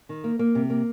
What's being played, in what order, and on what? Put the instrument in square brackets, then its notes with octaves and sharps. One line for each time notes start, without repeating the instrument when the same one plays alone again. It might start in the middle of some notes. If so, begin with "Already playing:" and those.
[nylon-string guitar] D#3
A#3
A#3
C3
A#3